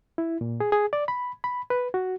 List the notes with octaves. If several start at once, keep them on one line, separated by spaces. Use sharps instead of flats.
E4
A#2
G#4
G#4
D5
B5
B5
B4
F#4